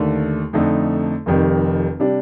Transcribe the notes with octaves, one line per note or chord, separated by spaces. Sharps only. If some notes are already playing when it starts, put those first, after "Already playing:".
Already playing: D#2 D3 A3
F2 D3 A3 D#4
F1 F2 D#3 G3
C3 G3 D4